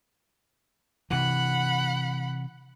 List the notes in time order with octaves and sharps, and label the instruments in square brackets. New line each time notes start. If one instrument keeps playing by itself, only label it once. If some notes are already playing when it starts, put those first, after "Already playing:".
[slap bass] C3 E3 [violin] F#5 B5